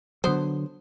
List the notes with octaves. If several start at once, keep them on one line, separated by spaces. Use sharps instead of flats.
D3 F#3 B3 C5